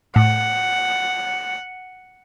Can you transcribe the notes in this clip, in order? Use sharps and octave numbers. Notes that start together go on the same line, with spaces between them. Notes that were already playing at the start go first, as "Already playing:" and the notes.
A2 F#5